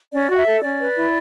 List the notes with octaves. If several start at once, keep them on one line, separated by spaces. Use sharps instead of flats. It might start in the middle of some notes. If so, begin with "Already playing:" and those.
C#4 D5
F#4 F#5
E5
A4
C#4 D5
B4
E4